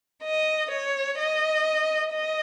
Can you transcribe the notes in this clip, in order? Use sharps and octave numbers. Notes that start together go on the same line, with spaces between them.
D#5
C#5
D#5
D#5